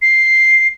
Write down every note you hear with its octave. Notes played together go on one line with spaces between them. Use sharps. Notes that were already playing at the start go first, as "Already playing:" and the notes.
C7